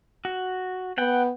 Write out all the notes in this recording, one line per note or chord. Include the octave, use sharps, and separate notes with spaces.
F#4
B3 F#5 G5